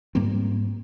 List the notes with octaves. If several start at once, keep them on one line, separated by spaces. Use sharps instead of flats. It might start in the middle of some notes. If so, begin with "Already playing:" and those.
G#2 G3 A#3 C4